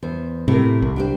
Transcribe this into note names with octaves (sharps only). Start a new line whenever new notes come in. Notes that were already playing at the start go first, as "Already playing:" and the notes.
E2 C5
A2 C3 A#4
C2
D4 G4 C5